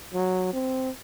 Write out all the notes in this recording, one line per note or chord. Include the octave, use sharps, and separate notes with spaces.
F#3
C4